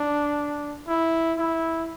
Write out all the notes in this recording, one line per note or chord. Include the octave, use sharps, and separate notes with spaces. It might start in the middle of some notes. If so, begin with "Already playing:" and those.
Already playing: D4
E4
E4